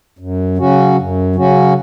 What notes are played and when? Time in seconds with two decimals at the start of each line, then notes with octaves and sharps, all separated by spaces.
0.19 F#2
0.57 C#3 F#3 C#4 F#4
0.97 F#2
1.35 C#3 F#3 C#4 F#4